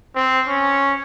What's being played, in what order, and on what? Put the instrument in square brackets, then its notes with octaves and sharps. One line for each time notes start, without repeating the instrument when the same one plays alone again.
[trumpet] C4
C#4